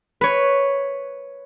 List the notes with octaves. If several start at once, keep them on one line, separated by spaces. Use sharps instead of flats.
B4 C#5